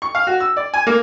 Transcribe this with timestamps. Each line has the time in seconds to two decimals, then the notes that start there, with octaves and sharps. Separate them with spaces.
0.02 C#6
0.15 F5
0.27 F#4
0.40 E6
0.57 D5
0.74 G#5
0.87 A#3